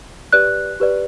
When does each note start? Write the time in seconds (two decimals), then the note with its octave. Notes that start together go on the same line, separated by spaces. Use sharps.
0.33 G4 B4 D5 F#6
0.80 G4 B4 D5